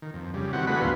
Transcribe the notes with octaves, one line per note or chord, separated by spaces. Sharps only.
D#3
F2
C#3 G3
D#3 E3 C4 F#4 F#5
A3 D4 F#4 G#4 B4 B5
D2 G2 B3 E4 F5 C6